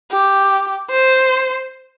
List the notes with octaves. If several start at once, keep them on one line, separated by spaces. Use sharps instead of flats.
G4
C5